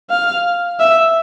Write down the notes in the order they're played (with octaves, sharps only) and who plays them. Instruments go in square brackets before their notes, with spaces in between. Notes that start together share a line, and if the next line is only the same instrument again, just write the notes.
[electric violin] F5
E5